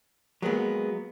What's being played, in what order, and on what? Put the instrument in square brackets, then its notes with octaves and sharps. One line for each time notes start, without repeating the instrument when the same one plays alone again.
[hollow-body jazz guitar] F#3 G#3 A#3 B3